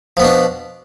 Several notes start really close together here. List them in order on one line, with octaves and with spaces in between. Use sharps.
F3 B3 B2 D4